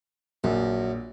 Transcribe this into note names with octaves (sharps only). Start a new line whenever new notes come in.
A#1 F#2